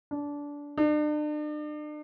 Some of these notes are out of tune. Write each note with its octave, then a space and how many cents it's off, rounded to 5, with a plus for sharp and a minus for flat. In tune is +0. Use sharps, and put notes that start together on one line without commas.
D4 -20
D4 +40